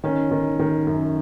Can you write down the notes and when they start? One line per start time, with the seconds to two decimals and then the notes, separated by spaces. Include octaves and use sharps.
0.04 D#3 C#4
0.31 D#3
0.59 D#3
0.87 F#2